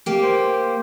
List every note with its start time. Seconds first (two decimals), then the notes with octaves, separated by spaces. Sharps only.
0.06 A#3 G4
0.22 C5